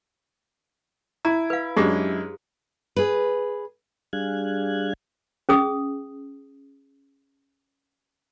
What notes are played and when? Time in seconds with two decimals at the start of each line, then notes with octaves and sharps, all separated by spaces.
1.25 E4 A#5
1.50 B4 F5
1.77 F#2 G#3 D4 G4 G#4 C#5
2.96 G#4 B4
4.13 G3 D4 G#4 F5 F#6 G#6
5.49 C#4 G#4 D#6